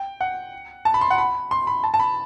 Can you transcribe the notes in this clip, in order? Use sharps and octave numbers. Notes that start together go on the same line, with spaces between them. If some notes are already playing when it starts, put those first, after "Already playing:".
Already playing: G5
F#5
A5
B5
C6
F#5
B5
C6
B5
A5
A5
B5